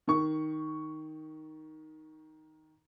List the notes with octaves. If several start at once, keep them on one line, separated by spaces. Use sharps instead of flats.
D#3 C#6